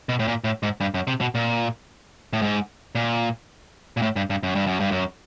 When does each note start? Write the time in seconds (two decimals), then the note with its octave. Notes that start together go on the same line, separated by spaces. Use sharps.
0.09 B2
0.19 A2
0.28 A#2
0.44 A2
0.63 G#2
0.81 G2
0.94 F#2
1.07 C3
1.21 B2
1.35 A#2
2.33 A2
2.42 G#2
2.95 A#2
3.97 A#2
4.02 A2
4.16 G2
4.30 G2
4.43 F#2
4.55 G2
4.67 F#2
4.80 G2
4.91 F#2